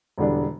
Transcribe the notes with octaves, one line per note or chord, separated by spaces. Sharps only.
E1 E2 D3 G3 D4